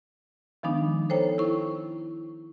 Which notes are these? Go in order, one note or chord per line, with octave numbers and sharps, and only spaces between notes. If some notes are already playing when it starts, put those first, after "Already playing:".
D#3 F3 G#3 B3 D4 D#4
A4 C5 C#5 G5 A#5
E4 C#6